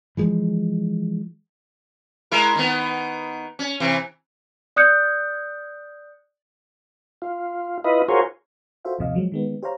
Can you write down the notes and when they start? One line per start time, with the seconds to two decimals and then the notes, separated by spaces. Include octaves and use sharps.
0.17 E3 F3 G#3
2.31 G#3 E4 A#4
2.55 D#3 B3
3.59 C#4
3.80 C3 E3
4.76 D5 D#6 F#6 G6 C#7
7.22 F4
7.84 E4 F4 B4 D#5
8.08 F4 F#4 G#4 A#4 C5 C#5
8.85 F4 F#4 A4 C5 E5 F5
8.99 A1 D#2 C3 F3 D#5 F5
9.15 F3 F#3 G#3
9.32 D#3 G#3 B3
9.63 G4 C5 C#5 F5 A#5